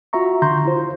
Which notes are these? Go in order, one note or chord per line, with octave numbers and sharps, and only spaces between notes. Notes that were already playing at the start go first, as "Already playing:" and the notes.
F4 F#4 E5 A#5 C#6
D3 A#5 C6 G6
E4 F4 C5